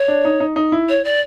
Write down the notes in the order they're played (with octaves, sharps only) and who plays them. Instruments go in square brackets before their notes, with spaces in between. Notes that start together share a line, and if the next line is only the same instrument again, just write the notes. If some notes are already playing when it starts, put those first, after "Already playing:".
Already playing: [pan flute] C#5
[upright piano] D4
D#4
D#4
D#4
E4
[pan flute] C#5
D5